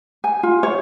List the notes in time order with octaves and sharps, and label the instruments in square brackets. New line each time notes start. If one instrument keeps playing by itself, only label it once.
[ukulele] G#5
F4
C#5